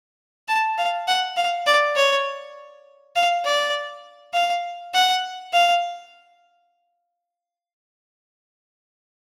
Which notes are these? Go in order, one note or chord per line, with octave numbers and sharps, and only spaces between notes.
A5
F5
F#5
F5
D5
C#5
F5
D5
F5
F#5
F5